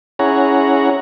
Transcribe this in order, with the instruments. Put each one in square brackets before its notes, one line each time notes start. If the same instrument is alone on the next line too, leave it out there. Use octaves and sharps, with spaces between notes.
[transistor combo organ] C#4 E4 G#4 C#5 F#5 A#5